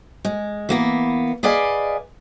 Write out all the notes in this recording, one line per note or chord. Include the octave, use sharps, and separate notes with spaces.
G#3
E3 A#3 B3
G#4 B4 D5 D#5 F5 G#5